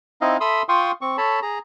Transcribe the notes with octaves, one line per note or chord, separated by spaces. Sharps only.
C4 D#4 E4 D#5 F5
A4 E5 B5 C6 D#6 E6
F4 F5 G5 C6 C#6 D#6
C4 C#6
A4 C#5 A5 B5
G#4 A#5